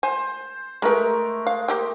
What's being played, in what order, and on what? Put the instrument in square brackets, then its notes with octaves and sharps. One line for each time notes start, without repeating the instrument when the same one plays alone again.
[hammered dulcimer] C5 [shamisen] G#5
[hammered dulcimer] G#3 A3 A#4 [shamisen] G#4 B4
[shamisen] F5
A#3 G4 G5